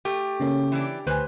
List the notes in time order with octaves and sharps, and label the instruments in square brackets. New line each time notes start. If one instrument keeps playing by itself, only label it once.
[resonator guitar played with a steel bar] A3 [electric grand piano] G4
[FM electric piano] C#3 A#3 C#4
[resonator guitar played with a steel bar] E3 D4
[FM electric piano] D2 G#5 [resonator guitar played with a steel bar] B4 C5